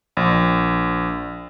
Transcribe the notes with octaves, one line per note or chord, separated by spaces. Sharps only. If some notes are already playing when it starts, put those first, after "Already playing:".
A#1